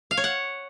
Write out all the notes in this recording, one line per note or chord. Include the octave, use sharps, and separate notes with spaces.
F5
C#5
F#5